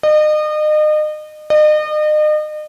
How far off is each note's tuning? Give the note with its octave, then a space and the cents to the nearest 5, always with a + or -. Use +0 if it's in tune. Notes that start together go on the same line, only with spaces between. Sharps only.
D#5 -35
D#5 -40